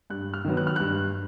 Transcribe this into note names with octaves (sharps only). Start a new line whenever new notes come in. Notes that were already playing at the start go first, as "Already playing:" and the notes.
G2 F#6
F6
D#3 F#3 B3
F#6
F6
G2 F#6